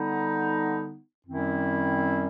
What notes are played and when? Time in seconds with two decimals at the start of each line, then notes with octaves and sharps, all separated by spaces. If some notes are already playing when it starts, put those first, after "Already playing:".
Already playing: D3 G3 B3 D#4
1.27 F#2 D#3 G3 C4 E4